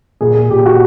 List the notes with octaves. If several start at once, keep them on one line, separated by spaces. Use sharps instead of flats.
A#2 G#4
G#4
A#2 G4
F#4